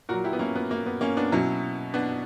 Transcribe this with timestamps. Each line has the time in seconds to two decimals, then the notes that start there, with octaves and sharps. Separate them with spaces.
0.09 A#2 F#3 F#4 A#4
0.24 E4 G4
0.33 B3
0.39 A#3 C#4
0.56 B3
0.71 A#3
0.86 B3
1.01 A#3 C#4
1.17 B3 D4
1.32 B2 F#3 C#4 E4
1.94 B3 D4